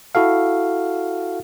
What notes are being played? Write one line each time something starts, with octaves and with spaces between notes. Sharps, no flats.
E4 F#4 A4 F5